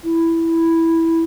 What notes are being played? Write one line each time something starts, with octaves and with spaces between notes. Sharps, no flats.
E4